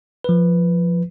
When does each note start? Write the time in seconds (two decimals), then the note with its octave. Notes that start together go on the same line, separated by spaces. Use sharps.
0.24 F3 B4